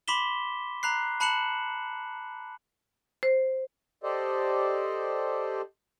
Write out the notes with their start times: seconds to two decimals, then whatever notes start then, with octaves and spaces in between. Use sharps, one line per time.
0.08 B5 C6 D6 B6 E7 G7
0.83 A#5 B5 F#6 C7
1.20 A5 B5 F#6 C#7 E7 F#7
3.23 C5
4.03 G4 A4 C5 D5 D#5